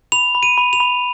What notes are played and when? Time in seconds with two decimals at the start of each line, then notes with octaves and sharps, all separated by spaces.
0.12 B5 F7
0.35 B5
0.43 D#7
0.58 B5
0.73 F7
0.80 B5